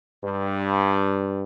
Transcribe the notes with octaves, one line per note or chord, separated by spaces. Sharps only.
G2